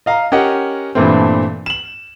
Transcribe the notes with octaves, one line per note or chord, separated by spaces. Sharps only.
D#5 F5 A#5
C#4 G4 A#4 D#5 F#5
G2 A#2 E3 A3 C4
E7 F#7